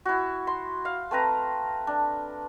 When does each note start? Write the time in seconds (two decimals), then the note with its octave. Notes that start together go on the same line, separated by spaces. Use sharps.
0.05 E4 F#4
0.47 C6
0.85 F5
1.11 A3 C4 B4 A#5
1.87 D4